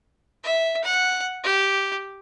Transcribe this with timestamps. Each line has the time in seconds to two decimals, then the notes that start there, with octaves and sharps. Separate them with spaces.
0.44 E5
0.84 F#5
1.44 G4